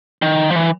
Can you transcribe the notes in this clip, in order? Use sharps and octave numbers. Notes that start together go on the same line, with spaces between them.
D#3
F3
E3